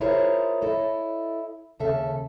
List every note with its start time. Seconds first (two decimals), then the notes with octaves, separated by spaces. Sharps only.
0.01 E4 F4 G#4 A#4 C5 C#5
0.61 E4 A4 C#5 D#5
1.79 D#2 C#3 A4 E5